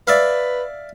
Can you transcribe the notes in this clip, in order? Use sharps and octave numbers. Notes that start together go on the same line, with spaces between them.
B4 D5 E5 F5